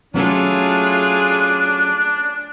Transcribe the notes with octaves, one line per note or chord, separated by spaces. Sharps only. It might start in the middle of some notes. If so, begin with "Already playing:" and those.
F#3 A3 C#4 D4 F4 G#4 A4